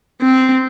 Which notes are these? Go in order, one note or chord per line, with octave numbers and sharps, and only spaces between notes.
C4